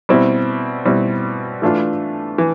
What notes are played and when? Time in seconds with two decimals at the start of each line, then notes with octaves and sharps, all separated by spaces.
0.09 B2 G3 C4 E4
0.85 B2 G3 C4 E4
1.62 E3 A3 D4 F4
2.38 E3